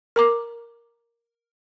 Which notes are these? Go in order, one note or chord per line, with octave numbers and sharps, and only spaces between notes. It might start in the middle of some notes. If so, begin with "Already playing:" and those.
A#4 A#5 D6